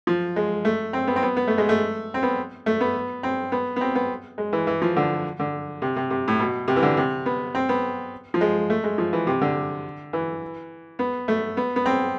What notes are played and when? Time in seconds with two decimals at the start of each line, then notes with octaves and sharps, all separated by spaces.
0.07 F3
0.36 G#3
0.65 A3
0.93 C4
1.07 B3
1.16 C4
1.22 B3
1.37 B3
1.47 A3
1.58 G#3
1.69 A3
2.14 C4
2.23 B3
2.66 A3
2.81 B3
3.23 C4
3.52 B3
3.76 B3
3.81 C4
3.95 B3
4.38 G#3
4.53 E3
4.67 E3
4.82 F3
4.96 D3
5.39 D3
5.82 C3
5.96 C3
6.10 C3
6.28 A2
6.40 B2
6.68 C3
6.76 E3
6.82 D3
6.97 C3
7.26 B3
7.55 C4
7.69 B3
8.34 F3
8.41 G#3
8.70 A3
8.84 G#3
8.98 F3
9.13 E3
9.27 C3
9.41 D3
10.13 E3
10.99 B3
11.28 A3
11.57 B3
11.76 B3
11.86 C4